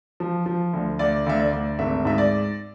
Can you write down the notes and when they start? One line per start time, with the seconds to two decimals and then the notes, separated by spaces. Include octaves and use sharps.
0.20 F3
0.46 F3
0.73 D2
0.99 D2 D5
1.26 D2 E5
1.40 D5
1.52 D2
1.79 G#1 E5
2.05 G#2 E5
2.18 D5